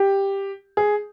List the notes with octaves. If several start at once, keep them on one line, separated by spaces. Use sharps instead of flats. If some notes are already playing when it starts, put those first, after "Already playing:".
Already playing: G4
G#4